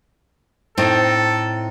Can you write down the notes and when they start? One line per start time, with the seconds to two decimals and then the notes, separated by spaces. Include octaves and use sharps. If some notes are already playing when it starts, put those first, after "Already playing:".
0.78 A2 C4 D#4 A4